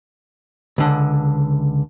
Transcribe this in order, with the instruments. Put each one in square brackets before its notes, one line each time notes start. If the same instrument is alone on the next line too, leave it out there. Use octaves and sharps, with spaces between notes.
[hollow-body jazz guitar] C#2 D3